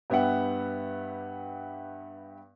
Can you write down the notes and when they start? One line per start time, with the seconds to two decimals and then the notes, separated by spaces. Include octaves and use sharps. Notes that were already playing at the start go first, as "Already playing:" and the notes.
0.10 G2 B3 G4 E5 F#5